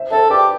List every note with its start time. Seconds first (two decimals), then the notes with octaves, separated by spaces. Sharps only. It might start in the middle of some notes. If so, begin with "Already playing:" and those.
Already playing: C5 E5
0.11 A4 C5 E5
0.30 G4 B4 D5